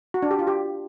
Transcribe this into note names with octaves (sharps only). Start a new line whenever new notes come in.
F#4
D4
G4
F4
G4